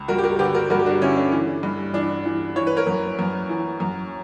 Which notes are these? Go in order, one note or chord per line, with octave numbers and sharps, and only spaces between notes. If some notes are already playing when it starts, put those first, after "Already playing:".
Already playing: C#2
G2 F#4 A#4
G4
F#4 A#4
D3 G4 B4
F#4 A#4
G2 F#4 A#4
G4
D4 F#4
D3 C#4 E4
D4
E3
G2
E3 D4
E3
E3 C#5
B4
A#4 C#5
F#2
F#2
E3
F#2